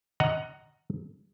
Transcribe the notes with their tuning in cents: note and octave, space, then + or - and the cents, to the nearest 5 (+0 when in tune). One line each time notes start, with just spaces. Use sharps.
D#5 +20 F#5 +10 A#5 +0